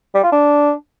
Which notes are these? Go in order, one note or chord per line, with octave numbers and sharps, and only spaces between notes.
G3
F4
D4